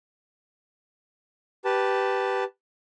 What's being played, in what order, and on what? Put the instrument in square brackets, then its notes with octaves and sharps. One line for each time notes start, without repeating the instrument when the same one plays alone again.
[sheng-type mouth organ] G4 B4 A5